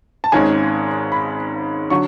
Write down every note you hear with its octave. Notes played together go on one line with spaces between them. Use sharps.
A5
G#1 G#2 G#3 C#4 G#5
B5
D3 F#3 C#6